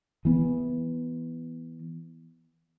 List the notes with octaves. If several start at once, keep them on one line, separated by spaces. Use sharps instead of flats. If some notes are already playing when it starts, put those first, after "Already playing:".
E3 B3